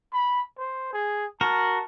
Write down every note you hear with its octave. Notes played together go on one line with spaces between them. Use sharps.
B5
C5
G#4
F#4 A#4 A5